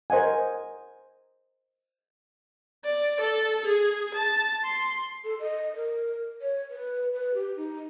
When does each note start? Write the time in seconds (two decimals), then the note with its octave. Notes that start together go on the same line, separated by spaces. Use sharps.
0.10 A#4 C5 D#5 F#5 G#5
2.85 D5
3.21 A4
3.65 G#4
4.15 A5
4.65 C6
5.25 A4
5.40 D#5
5.76 A#4
6.41 C#5
6.70 B4
7.12 B4
7.34 G4
7.57 D#4